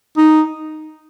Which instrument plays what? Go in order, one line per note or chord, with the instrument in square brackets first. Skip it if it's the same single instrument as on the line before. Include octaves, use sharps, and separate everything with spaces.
[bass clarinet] D#4